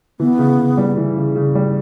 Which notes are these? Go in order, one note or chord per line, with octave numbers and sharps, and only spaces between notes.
E3 B3
C#3
C#3
G3
E3
C#3
C#3
G3